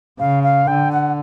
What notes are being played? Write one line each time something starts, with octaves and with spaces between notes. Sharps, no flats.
C#3 F5
F5
D3 G5
F#5